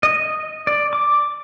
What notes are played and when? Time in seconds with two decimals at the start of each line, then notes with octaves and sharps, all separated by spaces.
0.03 D#5
0.67 D5
0.93 D6